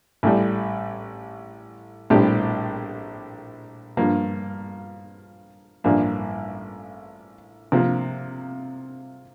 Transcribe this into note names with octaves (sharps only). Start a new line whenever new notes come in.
A1 A2 G3
A#1 A2 G3 C4 G4
G2 F3 A#3
A1 G2 F3 A#3 D4
C3 F3 A#3